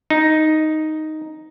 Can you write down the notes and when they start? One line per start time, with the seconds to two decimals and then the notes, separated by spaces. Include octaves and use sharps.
0.10 D#4